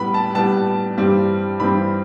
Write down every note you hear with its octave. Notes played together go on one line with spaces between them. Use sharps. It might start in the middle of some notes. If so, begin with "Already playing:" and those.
Already playing: A2 G3 B3 B5
A5
A2 G3 B3 A5
G2 E3 G3 C4
G2 E3 G3 C4 B5